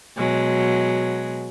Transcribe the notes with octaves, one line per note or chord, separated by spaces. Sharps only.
B2 F#3 G#3